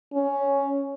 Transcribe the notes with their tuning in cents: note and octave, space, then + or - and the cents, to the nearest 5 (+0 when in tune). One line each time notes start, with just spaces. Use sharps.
C#4 +5